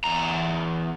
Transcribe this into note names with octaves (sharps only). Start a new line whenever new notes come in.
E2 A#5